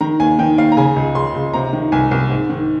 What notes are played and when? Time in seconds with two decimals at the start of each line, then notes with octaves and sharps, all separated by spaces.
0.01 D#3 A#5
0.20 D#2 G#5
0.39 D#3 G5
0.58 D#2 F5
0.72 A#5
0.77 C#3 G#5
0.96 C#2
1.15 C#3 C6
1.35 C#2
1.54 C3 A#5
1.73 D#3
1.92 C2 G#5
2.11 C2
2.31 G#2
2.50 D#3